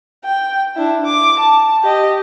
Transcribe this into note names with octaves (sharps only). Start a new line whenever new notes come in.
G5
D4 E4
D6
A5
G4 D#5